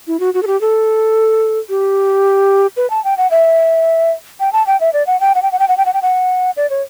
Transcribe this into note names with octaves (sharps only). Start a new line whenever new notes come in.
E4
F#4
F#4
A4
G4
A4
G4
B4
A5
G5
F#5
E5
G5
A5
G5
E5
D5
F#5
G5
F#5
G5
F#5
G5
F#5
G5
F#5
G5
F#5
D5
C#5